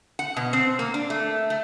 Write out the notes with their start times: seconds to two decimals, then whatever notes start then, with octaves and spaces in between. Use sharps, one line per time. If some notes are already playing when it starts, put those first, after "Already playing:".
0.19 F#5
0.37 B2
0.53 C4
0.79 A#3
0.94 D4
1.10 A3
1.50 A3